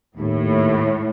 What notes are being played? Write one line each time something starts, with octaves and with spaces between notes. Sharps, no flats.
D#2 A2